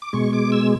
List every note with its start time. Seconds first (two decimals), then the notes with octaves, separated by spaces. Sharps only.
0.02 D6
0.13 B2 G#3 C#6
0.33 D6
0.52 E6